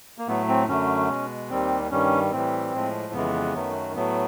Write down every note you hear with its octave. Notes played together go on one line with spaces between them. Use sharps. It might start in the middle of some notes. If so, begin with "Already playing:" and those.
A#3
A2 F#3 A3 B3
C4
F#2 D3 F#3 A3 C#4
B2 G#3
D#2 D#3 G3 C4
G2 D#3 G3 C#4
A2 E3 G3 C4
A2 F3 G#3
F2 C#3 E3 G#3 B3
F#2 D#3 F#3 A3
A2 F#3 A3 B3